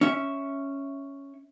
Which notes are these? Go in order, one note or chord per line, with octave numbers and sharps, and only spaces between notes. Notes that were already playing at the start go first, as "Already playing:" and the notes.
C#4 E5